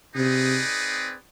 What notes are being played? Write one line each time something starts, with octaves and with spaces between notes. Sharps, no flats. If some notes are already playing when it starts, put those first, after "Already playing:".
C3 C4 D#4 G#4 B4 D5